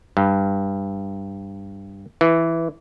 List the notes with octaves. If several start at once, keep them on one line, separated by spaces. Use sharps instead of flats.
G2
E3